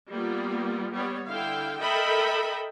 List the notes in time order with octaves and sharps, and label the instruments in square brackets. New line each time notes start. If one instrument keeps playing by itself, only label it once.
[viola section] G3 A#3 B3 F4
G3 B3 C#5
D3 E4 F5 G5
A4 A#4 D#5 E5 G5 B5